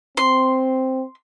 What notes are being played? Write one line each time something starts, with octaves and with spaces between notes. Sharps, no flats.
C4 C6